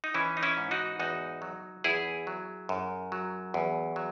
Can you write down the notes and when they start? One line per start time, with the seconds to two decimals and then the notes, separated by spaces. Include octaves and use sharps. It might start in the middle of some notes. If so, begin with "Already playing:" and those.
0.04 D#4
0.14 E3 C#4 E4
0.37 D#4
0.43 C#4 E4
0.57 G#2
0.71 D#4 F#4
0.99 E2 D#4 F#4
1.42 F#3
1.84 E2 E4 G#4
2.27 F#3
2.69 F#2
3.12 F#3
3.54 E2
3.96 F#3